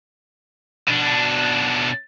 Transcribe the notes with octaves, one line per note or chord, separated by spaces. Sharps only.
B2 D4